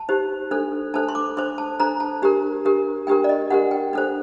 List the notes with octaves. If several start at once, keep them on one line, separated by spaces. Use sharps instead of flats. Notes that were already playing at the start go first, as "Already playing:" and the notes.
Already playing: A5
D#4 G4 C5
D4 A4 C5
D4 A4 C5 A5
C6
D6
D4 A4 C5 C6
A5
D4 A4 C5 A#5
A5
D4 G4 A#4
D4 G4 A#4
D4 G4 A#4 G5
D5
D#5
D4 G4 A#4 F#5
G5
D4 A4 C5